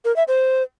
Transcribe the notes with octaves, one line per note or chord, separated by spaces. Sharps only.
A#4
E5
C5